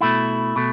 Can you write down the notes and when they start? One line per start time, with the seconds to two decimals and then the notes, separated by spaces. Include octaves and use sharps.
0.01 B2 A3 E4
0.56 B2 A3